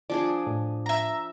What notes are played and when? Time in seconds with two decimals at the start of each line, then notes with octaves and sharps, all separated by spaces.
0.10 F3 D4 G#4 D5
0.47 A2
0.86 E5 A#5